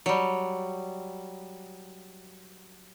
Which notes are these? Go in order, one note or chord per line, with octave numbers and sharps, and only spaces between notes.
F#3 G3